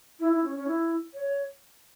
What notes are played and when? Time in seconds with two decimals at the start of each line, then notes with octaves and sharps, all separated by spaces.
0.19 E4
0.32 E4
0.43 C#4
0.55 C#4
0.67 E4
1.13 C#5